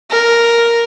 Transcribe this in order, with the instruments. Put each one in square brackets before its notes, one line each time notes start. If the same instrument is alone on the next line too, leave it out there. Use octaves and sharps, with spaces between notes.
[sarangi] A#4